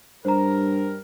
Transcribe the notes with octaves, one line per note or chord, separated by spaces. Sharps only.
G2 G3 A#4 C5 A#5